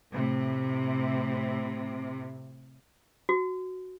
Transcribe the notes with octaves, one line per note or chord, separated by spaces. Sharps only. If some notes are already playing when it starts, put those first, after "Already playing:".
A2 C3
F#4